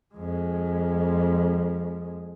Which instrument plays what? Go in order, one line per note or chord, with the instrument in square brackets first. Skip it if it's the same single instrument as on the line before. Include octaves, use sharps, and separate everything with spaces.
[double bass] F2 G#3